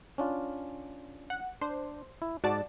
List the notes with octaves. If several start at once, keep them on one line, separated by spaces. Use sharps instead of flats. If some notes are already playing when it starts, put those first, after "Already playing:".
C#4 D4 F4
F#5
D4 C5
E4
G#2 F#4 D5 A5